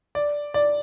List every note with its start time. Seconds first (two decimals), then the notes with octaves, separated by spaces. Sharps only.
0.15 D5
0.54 D5